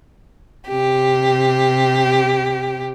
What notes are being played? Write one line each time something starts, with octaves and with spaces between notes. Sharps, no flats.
C3 G4